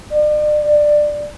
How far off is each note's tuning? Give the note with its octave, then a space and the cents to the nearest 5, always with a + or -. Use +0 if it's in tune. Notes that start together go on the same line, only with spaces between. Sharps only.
D5 +45
D5 +15